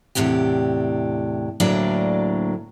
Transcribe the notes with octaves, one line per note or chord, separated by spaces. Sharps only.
E2 A2 C3 D4 G4
D2 A2 F#3 A#3 D4 D5